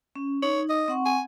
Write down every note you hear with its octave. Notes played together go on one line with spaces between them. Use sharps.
C#4
D#4 C#5
D#5
C4 F#5 C#6
G#5